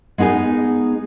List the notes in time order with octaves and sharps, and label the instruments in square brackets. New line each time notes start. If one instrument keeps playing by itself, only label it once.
[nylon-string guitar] G#3 B3 D#4 G#4 G#5